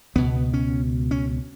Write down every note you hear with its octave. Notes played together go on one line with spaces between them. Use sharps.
C#2 B2 B3
C#4
C#4